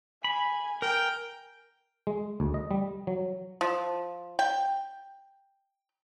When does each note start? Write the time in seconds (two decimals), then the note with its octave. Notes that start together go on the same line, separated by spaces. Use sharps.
0.24 G#5 B5
0.82 A#4 G5
2.07 G#3
2.40 D2
2.54 D#5
2.71 G3
3.07 F#3
3.61 F3
4.39 G5